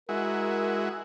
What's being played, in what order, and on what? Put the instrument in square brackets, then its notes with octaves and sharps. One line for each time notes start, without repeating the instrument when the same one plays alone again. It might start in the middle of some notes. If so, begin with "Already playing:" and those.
[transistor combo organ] G#3 E4 F#4 [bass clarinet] A#4